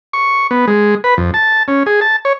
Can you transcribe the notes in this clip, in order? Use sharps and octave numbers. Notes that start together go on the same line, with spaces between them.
C#6
B3
G#3
B4
F2
A5
C#4
G#4
A5
C#5